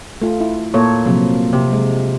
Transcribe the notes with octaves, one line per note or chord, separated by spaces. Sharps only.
A3 F4
E4
A#2 A4 C#5
C3 F3 F#3
C3
G#3